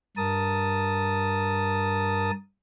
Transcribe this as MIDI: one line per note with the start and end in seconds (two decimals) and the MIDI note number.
0.17 2.31 43
0.17 2.31 70
0.17 2.31 81
0.17 2.31 87